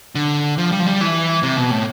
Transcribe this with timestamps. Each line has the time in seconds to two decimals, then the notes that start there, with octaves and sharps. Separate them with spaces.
0.15 D3
0.58 F3
0.72 G3
0.80 F3
0.86 G3
1.01 E3
1.43 C3
1.57 B2
1.71 A2